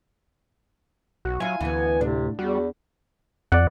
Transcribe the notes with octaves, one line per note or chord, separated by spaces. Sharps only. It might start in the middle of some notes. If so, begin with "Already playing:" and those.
B1 F#4
F#3 E4 F4 G#5
D2 E3 B3
A2 C3 D4
E2 G3 F#4
F2 D5 F#5